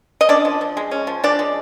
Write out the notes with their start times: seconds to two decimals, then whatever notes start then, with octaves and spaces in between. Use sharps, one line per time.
0.21 D#5
0.29 C#4 D4 D5
0.45 F3
0.61 F3
0.77 G#3
0.91 C#4
1.07 F3
1.24 F3 D4 D5
1.39 G#3